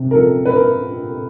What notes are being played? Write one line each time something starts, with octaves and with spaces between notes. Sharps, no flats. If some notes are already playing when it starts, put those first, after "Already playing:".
Already playing: C3
A#4
F3 A4
B4
A#4